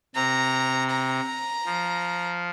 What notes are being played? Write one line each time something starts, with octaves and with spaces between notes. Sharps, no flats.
C3 A#5
A#5
F3